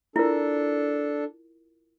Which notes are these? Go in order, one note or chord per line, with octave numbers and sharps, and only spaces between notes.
D4 E4 F4 A4 A#4